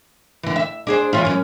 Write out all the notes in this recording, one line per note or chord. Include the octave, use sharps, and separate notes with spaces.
D3 E3
E5
D4 G#4 C5
E3 C#4 F4
F#2 C#4